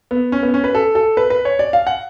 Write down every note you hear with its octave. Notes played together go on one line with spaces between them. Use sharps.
B3
C#4
B3
C#4
B4
A4
A4
B4
B4
C#5
D5
F5
F#5